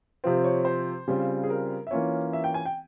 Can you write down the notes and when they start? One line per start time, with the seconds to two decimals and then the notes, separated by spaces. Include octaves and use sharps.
0.24 C3 F3 C4 F4
0.44 C#5
0.65 C5
1.08 C#3 G3 C4 F4
1.43 G#4
1.50 A#4
1.87 E5
1.91 E3 A#3 C#4 F4 C#5
2.33 E5
2.44 G5
2.54 G#5
2.65 G5